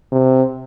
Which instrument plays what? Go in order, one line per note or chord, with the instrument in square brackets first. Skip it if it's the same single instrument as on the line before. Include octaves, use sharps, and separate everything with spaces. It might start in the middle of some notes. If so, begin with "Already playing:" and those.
[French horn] C3